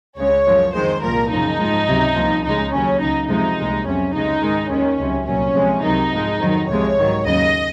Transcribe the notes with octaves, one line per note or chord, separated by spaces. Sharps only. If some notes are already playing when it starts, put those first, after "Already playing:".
C#2 C#3 G#3 C#5
F#2 F3 G#3
F2 D#3 G#3 C5
C2 A#2 F3 A#4
F#2 C#3 F3 D#4
G#2 F3 G#3
C#2 C3 F#3
C2 A#2 F3
C#2 C#3 G#3 D#4
D#2 C#3 F#3 C#4
C#2 C#3 F#3 D#4
F2 C3 F3 G#3 D#4
C2 A#2 G#3
F2 C3 F#3 C#4
C#2 C#3 G#3 D#4
G#2 D#3 G#3
D#2 D#3 G#3 C#4
C#2 C3 F#3
C2 A#2 F#3 C#4
F2 C3 F3 G#3
C2 C3 D#3 F#3 D#4
G#2 F3 G#3
F2 D#3 F#3
C2 C3 F3 G#3 C#5
G#2 D#3 F#3
D#2 C#3 F#3 D#5